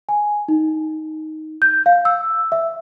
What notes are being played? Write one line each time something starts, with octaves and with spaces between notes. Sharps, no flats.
G#5
D#4
G6
F5
E6
E5